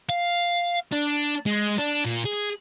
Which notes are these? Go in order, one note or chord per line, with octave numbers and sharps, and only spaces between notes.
F5
D4
G#3
D4
A#2
G#4